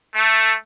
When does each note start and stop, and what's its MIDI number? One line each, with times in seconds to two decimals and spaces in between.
0.15 0.54 57